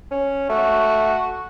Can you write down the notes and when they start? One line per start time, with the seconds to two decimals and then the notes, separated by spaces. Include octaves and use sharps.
0.11 C#4
0.49 A3 F#4